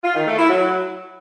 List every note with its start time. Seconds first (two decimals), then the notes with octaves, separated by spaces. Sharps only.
0.04 F4
0.15 D#3
0.26 A3
0.38 E4
0.49 F#3